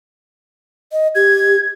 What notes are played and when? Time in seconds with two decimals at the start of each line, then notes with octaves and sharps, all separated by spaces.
0.92 D#5
1.15 G4 G#6